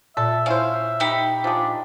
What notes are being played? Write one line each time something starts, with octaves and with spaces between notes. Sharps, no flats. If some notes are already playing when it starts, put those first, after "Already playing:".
A#2 A4 E5
C#4 E4 C5 F5
D#4 G4 B5
F3 G#3 D4